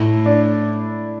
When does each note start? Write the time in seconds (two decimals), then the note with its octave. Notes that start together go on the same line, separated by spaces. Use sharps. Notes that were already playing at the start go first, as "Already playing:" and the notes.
Already playing: A2 E4
0.26 D4